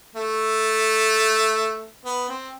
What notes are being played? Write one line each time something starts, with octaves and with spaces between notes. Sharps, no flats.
A3
B3
C4